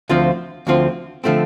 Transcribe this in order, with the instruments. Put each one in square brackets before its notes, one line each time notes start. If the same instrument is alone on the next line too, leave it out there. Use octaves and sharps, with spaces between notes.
[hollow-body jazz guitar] D2 D3 F3 C4 F4
D2 D3 F3 C4 F4
D3 F3 A3 C4